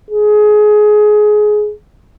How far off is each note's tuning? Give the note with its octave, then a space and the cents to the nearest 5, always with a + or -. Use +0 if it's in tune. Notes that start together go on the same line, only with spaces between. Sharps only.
G#4 +20